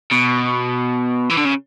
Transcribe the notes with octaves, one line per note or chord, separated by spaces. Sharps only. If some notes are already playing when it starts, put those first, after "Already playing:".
B2
E3
D3
C#3